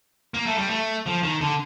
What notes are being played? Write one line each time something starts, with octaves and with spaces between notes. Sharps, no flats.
A#3
A3
G3
A3
F3
D#3
D3